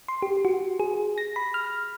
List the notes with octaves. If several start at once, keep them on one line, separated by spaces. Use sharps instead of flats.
C6
G4
F#4
G#4
A#6
B5
F6